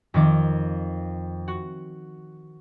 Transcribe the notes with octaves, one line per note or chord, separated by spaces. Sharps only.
F2 D#3 D6
F#4